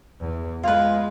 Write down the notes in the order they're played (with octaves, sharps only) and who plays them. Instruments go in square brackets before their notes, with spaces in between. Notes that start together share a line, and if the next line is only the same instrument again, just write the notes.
[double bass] E2
[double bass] G#3 [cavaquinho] F4 B4